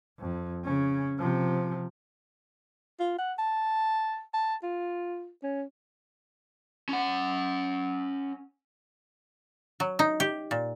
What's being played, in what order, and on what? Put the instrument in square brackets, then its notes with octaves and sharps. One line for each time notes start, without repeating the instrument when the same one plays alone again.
[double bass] F2
C#3 C#4
C3 F3
[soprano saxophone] F4
F#5
A5
A5
F4
C#4
[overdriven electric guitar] C#4 F#5
[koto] F#3
D#4
G4
A#2